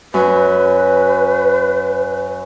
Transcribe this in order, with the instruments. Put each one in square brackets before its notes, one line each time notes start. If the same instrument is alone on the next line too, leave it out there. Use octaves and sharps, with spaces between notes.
[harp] F#2 [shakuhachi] B4